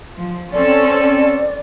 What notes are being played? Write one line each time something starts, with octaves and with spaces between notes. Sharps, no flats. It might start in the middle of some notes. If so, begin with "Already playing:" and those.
F3
C4 C#4 A4 D5